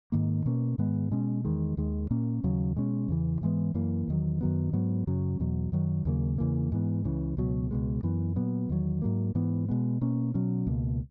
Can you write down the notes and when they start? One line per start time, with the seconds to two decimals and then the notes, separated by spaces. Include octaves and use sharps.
0.12 G#2 D#3 A#3
0.46 B2 A#3 C#4
0.78 G#2 D#3 G#3 B3
1.11 B2 G#3 C#4
1.45 E2 D#3 G#3
1.77 D#2 D#3 G#3
2.11 A#2 A#3 C#4
2.44 D#2 C#3 F#3
2.76 B2 G#3 C#4
3.08 E2 C#3 E3
3.41 G#2 E3 G#3 B3
3.74 F#2 E3 A#3
4.08 E2 D#3 F#3
4.41 F#2 D#3 F#3 B3
4.73 G#2 F#3 B3
5.07 F#2 C#3 F#3 C#4
5.40 E2 B2 F#3
5.72 F#2 D#3 F#3
6.05 D#2 C#3 F#3 A#3
6.38 E2 C#3 E3 A#3
6.72 G#2 E3 B3
7.04 C#2 C#3 E3
7.37 C#2 B2 F#3
7.71 C#2 B2 G#3
8.03 F#2 E3 B3
8.36 A#2 F#3 B3
8.69 E2 D#3 F#3
9.02 G#2 F#3 A#3
9.35 G#2 E3 B3
9.68 B2 G#3 B3
10.01 B2 A#3 C#4
10.34 B2 F#3 C#4
10.67 C#2 B2 A#3